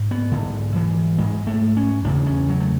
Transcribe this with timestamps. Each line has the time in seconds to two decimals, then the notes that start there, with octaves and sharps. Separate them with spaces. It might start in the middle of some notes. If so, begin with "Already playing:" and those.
Already playing: G#2
0.11 B3
0.32 G#2 D3
0.76 E3
1.18 G#2 G#3
1.47 A3
1.77 C#4
2.05 E2 C#3 D4
2.26 C#4
2.49 F#3
2.60 A3